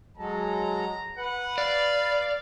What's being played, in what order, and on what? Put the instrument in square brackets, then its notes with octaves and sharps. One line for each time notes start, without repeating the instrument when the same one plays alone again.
[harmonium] F#3 G#3 A4 [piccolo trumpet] A#5
[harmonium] B4 [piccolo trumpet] F#5
[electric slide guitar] D5 [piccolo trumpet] F5